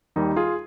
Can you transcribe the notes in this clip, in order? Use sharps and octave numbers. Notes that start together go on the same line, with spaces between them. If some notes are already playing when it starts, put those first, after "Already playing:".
D#2 D#3 G3 D#4
F4 G#4